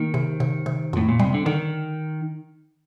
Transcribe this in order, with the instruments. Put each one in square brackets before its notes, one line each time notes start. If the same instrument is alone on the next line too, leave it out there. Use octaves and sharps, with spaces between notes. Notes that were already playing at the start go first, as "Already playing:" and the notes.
Already playing: [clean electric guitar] D#3 [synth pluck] A#3
[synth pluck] C3
C3
C3
[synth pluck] F2 [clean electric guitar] A2
[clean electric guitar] A#2
[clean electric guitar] C3 [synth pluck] G3
[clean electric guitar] D3
[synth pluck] D3 [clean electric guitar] D#3